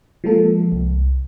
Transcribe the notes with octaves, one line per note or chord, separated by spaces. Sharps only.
F3 G#3 A#3 A4
C2